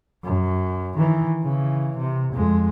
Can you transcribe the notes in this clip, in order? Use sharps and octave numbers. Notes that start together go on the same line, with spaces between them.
F#2
D#3 E3
C#3 E3
C3
F2 G#3